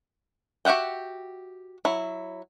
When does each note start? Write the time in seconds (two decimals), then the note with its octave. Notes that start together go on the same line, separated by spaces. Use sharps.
0.65 F#4 G4 E5 F#5 G5
1.85 F#3 E4